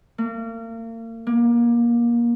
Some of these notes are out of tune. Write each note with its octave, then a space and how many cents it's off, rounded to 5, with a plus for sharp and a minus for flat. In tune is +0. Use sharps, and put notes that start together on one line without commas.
A#3 -40
A#3 +25